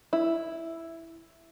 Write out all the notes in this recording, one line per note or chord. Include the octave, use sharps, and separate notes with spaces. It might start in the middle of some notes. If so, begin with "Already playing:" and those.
E4